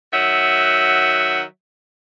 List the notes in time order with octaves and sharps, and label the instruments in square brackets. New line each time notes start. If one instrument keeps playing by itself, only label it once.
[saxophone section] D#3 F#3 E5 F#5